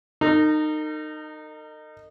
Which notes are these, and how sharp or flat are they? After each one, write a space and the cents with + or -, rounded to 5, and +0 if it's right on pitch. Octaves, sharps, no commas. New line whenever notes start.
D#4 -20 A#4 -45